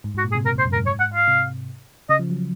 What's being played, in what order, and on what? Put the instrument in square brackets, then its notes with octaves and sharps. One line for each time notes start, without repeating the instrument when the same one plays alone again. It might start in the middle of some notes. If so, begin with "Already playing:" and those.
[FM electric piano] G#2
G#2
[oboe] F#4
[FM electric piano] A#2
[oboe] G#4
[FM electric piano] C3
[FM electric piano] A#2 [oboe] A#4
[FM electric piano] G#2
[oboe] C5
[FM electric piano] F#2
[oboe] A#4
[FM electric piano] G#2
[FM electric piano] G#2 [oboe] C#5
[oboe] F#5
F5
[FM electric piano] C3
[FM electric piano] C#3 [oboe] D#5
[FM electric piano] F3
F#3